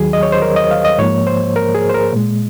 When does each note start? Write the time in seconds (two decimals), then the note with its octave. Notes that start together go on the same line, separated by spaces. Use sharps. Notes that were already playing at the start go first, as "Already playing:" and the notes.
Already playing: D#2 D#3 F#3 G#4
0.13 D#5
0.23 C#5
0.32 C5
0.42 A#4
0.56 D#5
0.71 F5
0.85 D#5
0.98 G#2 F3 A#3 C#5
1.27 C5
1.56 A#4
1.74 G#4
1.89 C5
1.94 A#4
2.13 A#2 G#3